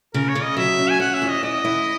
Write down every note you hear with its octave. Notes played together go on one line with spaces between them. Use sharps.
C#3 A#4
C#5
C#3
D#5
F#3 E5
C#4
G#5
C#4 F#5
E5
E2
D#5
E4 D#5
E4